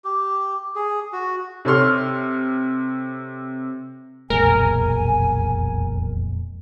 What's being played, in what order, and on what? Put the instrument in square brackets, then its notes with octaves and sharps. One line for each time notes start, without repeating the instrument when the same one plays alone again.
[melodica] G4
G#4
F#4
[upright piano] C3 A4 C#5 C6 F6
[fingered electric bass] E1 B1 [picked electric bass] F2 A#2 G#3 [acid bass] A#4 [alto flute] G#5